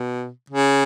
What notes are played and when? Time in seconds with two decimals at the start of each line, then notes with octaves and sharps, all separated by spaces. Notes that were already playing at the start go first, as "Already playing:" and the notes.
Already playing: B2
0.50 C#3